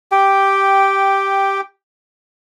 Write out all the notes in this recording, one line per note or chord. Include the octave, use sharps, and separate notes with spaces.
G4 G5